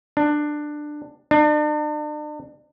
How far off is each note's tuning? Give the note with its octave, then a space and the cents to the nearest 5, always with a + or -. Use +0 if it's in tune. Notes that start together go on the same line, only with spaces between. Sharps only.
D4 +15
D4 +40